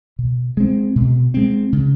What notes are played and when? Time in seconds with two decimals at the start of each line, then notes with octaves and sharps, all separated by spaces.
0.19 B2
0.57 G#3 C4
0.96 B2
1.34 G#3 C4
1.73 C#3